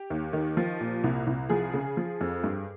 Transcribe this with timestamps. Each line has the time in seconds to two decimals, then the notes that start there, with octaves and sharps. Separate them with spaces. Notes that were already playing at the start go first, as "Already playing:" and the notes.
Already playing: G4
0.10 D#2
0.33 D#3
0.57 F3
0.81 A#2
1.04 C2
1.27 C2
1.50 F3 G#4
1.74 C#3
1.97 F3
2.21 F2
2.44 G2